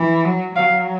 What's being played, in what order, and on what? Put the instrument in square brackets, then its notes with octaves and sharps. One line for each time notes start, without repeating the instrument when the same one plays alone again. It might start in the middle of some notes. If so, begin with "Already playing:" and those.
Already playing: [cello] E3
F#3
[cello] F#3 [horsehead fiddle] F5